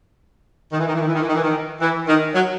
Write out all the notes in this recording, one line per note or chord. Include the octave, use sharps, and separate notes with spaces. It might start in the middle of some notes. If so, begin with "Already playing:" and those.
D#3
E3
D#3
E3
D#3
E3
D#3
E3
D#3
E3
D#3
E3
D#3
F#3